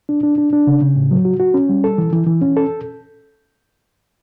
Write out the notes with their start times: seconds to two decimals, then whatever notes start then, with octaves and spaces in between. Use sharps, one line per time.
0.09 D4
0.23 D4
0.38 D4
0.53 D4
0.67 C#3
0.82 C#3
0.96 A2
1.11 F#3
1.25 F#4
1.40 F#4
1.54 C#4
1.69 G3
1.84 A4
1.98 E3
2.13 E3
2.27 E3
2.42 C#4
2.57 A4